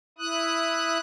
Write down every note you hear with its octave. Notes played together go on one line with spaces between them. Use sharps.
E4 D#6 F#6